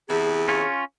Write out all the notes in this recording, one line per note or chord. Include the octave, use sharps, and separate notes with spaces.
E2 C3 E3 G#4
C#4 F4 C#5